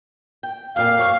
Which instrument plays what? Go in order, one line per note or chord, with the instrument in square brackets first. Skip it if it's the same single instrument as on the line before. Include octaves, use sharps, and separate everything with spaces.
[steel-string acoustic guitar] G5
[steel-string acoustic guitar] F2 A#2 [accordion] F5
[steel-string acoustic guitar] F#2 C#5